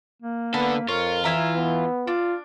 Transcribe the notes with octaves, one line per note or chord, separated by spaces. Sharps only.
A#3
D3 B3 A4 B4
F2 F4 A#4 C#5
E3 E4 E5 A#5
B3
D4 F4